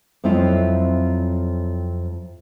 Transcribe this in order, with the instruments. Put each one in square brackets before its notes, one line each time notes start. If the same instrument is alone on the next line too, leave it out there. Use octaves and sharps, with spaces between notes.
[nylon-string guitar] F2 F#3 C4 E4 F4 D#5